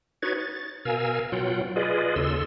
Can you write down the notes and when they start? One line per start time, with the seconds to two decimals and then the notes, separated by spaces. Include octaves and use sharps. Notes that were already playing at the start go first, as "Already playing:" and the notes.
0.22 D#4 F#4 B4 C#5 G#6 A6
0.39 A6
0.85 B2 A#4 F5 G#5 E6
1.32 B2 F#3 F4 F#5 G5
1.76 F4 G#4 B4 D5 D#5
2.16 D#2 C#3 A4 C6 E6